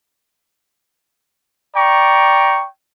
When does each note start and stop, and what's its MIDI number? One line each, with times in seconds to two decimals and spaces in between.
1.75 2.65 74
1.75 2.65 79
1.75 2.65 82
1.75 2.65 85